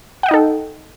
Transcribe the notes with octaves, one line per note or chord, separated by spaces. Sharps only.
D#4 A4 D#5 F#5 G5